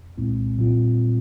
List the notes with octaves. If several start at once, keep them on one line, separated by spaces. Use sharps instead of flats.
C2 A#2 G#3 C4 E4
A#2 G3 C4 F4